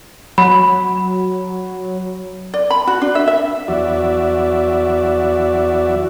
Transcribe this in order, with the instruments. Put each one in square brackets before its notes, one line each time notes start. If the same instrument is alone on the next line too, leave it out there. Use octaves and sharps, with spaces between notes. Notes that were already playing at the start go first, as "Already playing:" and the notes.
[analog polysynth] F#3 [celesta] B5
[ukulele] D5
B5
F#4
D4
E5
E5
[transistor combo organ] E2 F#3 F#4 D5 E5